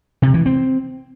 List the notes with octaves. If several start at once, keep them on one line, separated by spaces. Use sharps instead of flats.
C3
E3
C4